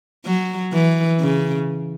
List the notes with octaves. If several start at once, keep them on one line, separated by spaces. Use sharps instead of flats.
F#3
E3
C#3